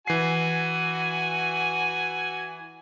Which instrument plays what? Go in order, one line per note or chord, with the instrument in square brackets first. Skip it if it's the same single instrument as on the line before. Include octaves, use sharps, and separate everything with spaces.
[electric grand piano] E3 C7 [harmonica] F#4 G#5